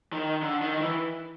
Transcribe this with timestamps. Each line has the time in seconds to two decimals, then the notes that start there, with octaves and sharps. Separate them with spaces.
0.13 D#3
0.42 D3
0.61 D#3
0.77 D#3
0.81 E3